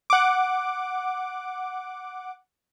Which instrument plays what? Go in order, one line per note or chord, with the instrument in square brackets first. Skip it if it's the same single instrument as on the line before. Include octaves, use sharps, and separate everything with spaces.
[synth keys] F#5 D6